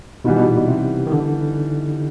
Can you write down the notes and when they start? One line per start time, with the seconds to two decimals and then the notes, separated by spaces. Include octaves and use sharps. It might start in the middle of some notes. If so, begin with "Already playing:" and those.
0.25 B2 E3 G3 B3 D#4
0.36 B2
0.46 A#2
0.57 B2
0.68 C3
1.07 D#3
1.12 D3